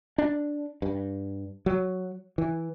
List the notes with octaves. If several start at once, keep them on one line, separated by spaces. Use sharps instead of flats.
D4
G2
F#3
E3